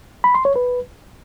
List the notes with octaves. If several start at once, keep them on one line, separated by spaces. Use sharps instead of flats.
B5
C6
C#5
B4